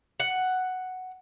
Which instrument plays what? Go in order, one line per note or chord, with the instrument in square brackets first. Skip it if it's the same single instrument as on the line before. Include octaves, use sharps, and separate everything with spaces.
[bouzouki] F#5